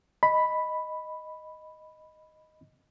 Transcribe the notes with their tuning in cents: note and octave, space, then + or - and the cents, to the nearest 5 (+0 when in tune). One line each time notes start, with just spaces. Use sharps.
D#5 +0 B5 +0